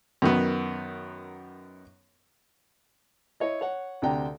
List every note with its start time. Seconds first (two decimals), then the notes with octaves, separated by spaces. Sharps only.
0.22 F#2 D#3 B3
3.40 E4 C#5 D#5
3.61 C#5 F#5
4.02 D2 C3 D4 G5 A#5